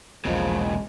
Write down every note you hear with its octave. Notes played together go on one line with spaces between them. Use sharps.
E1 B1 E2 A#2 C#3 F3 G#3